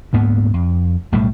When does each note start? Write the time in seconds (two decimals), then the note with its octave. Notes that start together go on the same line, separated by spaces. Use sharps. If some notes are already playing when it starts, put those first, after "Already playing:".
0.13 D2 G#2 A#3 B3
0.54 F2
1.12 B1 A2 G3 A3